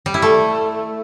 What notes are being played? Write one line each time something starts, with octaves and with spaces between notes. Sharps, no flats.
G3
E4
A3